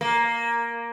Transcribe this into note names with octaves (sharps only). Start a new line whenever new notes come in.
A#3